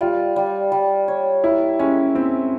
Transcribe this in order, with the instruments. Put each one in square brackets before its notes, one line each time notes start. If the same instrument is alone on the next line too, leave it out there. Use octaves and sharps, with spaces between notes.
[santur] G3 [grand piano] F4
[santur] G3
G3
C#5
[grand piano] E4 [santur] A#4
[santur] G#3 [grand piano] C#4
[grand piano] C4 [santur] E4